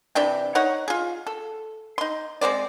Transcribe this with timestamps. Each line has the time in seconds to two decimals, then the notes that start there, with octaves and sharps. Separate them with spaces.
0.15 C3 E3 D4 G5
0.55 D#4 C#5 F#5
0.88 F4 G#4
1.27 A4
1.98 D#4 C6
2.41 G#3 C4 C5 D5